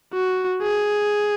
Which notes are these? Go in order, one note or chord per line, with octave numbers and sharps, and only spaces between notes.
F#4
G#4